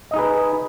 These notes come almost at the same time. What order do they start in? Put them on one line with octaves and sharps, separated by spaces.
D#5 D#4 G#4 B4